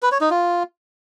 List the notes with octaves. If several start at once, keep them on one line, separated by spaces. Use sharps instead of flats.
B4
C#5
D#4
F4